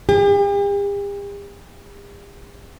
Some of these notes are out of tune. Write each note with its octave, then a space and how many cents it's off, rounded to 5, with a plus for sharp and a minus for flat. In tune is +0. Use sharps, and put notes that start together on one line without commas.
G4 +45